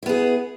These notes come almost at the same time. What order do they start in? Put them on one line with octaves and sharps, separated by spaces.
E4 B3 G#4